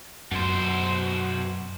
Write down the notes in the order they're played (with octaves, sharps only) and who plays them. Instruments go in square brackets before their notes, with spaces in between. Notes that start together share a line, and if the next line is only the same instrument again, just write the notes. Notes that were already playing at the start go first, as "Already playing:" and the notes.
[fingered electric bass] F#2 [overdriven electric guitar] B2 C5